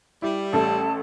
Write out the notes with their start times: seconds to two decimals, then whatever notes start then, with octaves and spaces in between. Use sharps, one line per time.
0.22 G3 E4
0.53 A1 A3 A4 A5